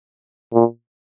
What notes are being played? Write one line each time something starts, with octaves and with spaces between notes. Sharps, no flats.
A#2